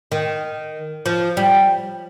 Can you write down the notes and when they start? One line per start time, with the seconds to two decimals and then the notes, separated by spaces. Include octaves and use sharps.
0.12 D#3
1.06 F3
1.37 G3